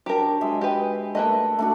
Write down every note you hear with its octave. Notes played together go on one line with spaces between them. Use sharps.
F#3 D4 G4 A#4
G#3 D#5 E5
G4 B4
A3 A#3 B4 D#5
A3 D4 F#4